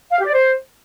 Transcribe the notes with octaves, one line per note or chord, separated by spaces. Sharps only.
F5
G4
D5
C5